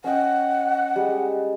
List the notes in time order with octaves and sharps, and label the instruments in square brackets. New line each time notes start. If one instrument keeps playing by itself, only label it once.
[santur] C#4 D#5 G5 [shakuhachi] F#5
[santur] G3 G#3